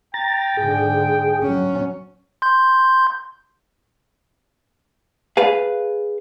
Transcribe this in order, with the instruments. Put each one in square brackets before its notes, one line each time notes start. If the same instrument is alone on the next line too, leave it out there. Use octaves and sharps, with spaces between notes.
[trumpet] G5 [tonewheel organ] A#5 A6
[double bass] G#2 D3 [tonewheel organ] G#4
[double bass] F#3 C#4
[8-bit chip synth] C6 G6
[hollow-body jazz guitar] G#4 B4 F5